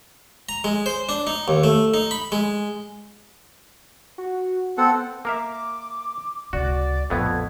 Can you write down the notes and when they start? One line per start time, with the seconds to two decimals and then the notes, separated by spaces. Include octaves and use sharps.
0.49 A#5
0.64 G#3
0.86 C5
1.09 D4
1.27 D#4
1.48 D#2
1.64 A3
1.94 D#4
2.11 B5
2.32 G#3
4.18 F#4
4.78 B3 C4 A4 F#5
5.25 A#3 A#4 E5 D6
6.53 C#2 C3 F#4 D5
7.10 A#1 F2 A2 A3 B3 G#6